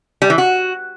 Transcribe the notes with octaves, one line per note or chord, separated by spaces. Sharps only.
G3
E3
F#4